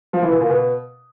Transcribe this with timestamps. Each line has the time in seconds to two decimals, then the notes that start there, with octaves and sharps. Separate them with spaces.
0.13 F3
0.22 E3
0.31 B2
0.40 A#2
0.50 B2